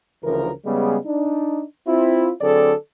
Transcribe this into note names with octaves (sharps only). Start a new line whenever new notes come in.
D2 C#3 E3 F3 A#4
C#3 G3 G#3 B3
D4 D#4
C4 E4 F4
D3 F#3 C4 G#4 A4 D5